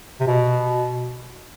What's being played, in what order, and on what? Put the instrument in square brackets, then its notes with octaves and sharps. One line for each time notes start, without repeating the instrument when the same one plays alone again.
[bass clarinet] C3
B2